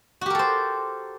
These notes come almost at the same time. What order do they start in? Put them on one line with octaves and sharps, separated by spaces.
F#4 G4 A#4 A4 C5